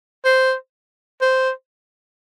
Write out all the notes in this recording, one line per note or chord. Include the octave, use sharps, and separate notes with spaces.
C5
C5